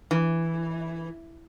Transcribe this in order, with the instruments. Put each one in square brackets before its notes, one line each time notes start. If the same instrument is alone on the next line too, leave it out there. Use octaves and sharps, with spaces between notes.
[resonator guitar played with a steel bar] E3